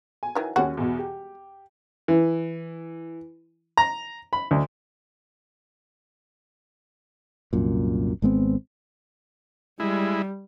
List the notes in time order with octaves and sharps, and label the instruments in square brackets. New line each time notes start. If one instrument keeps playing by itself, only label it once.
[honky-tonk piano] G#5
[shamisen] D#3 E3 F#3
[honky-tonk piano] D#2 C#4 G#5 [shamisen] G3 G#3 F#4
[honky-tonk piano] E2 B2
G4
[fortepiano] E3
A#5
B5
D2
[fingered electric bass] C2 F#2 A#2
G#1 G#3 B3 C4
[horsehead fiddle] G3 [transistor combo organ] G#3 E4